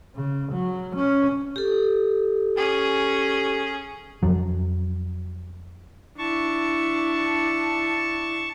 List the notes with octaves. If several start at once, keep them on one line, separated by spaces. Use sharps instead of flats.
C#3
F#3
C#4
G4 A4
C#4 G#4
F2 F#3
D4 E4 A5 C#6